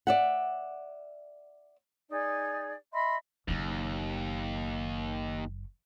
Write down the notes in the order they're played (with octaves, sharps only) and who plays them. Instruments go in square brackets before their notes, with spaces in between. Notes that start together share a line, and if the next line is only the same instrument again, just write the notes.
[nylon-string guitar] D5 E5 F#5
[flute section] D#4 G#4 D5
D#5 E5 B5 C6
[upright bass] F#1 F#3 [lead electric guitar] D#2